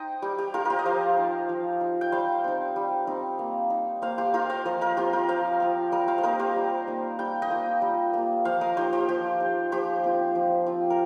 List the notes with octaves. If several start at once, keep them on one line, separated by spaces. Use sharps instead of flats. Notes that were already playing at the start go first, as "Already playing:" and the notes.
Already playing: D#4 C5 D#5 G5
G3 G4
G4
D#4 F4 A#4
G4 A#4 C5
D#5
F3 C5 F5
D#4
F3
D#4
G5
G3 C5 F5
C4 D#4
G3
C4 D#4
A#3
D#4
A#3 C5 F5
G4 C5
D#4 F4 A#4
C5 F5
F3 A#4 D#5
A#4 D#5
C4 F4 G4 C5
F4 A#4
F3 C5 F5
C4 F4
G3 A#4 D#5
C5 F5
C5
A#3 D#4 A#4 D#5
G4 C5
G3
A#3 D#4
G3 G5
D#5 G5
A#3 F4
G3
A#3 F4
F3 C5 F5
A#4 D#5
D#4 G4 C5
G4 C5
F3 G4
D#4
F3 G4 C5
C4 F4
F3
C4 F4
A#4